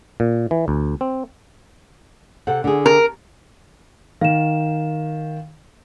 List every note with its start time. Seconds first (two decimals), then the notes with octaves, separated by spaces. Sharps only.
0.20 A#2
0.51 E3
0.68 D2
1.01 C4
2.47 C3 A4 F#5
2.64 D3 G#4
2.86 A#4
4.21 D#3 F5 E7